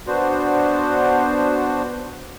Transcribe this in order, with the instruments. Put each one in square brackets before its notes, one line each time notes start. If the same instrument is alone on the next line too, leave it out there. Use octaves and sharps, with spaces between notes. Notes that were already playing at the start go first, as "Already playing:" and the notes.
[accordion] B3 D4 F#4 C5